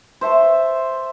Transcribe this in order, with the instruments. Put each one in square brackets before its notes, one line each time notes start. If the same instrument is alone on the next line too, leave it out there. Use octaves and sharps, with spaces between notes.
[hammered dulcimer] C5 E5 A5 C#6